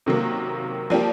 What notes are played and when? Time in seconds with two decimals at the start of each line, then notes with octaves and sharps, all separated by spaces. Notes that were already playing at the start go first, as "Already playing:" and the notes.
0.06 C3 D#3 F#3 A#3
0.90 F3 A#3 D4 G4